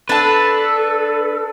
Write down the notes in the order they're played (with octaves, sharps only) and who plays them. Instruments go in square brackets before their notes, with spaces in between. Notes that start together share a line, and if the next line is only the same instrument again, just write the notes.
[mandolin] D4 A5 [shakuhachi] A4 [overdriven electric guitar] B4